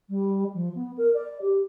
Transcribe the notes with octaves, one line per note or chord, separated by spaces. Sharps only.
G3
F3
B3
A#4
D5
G4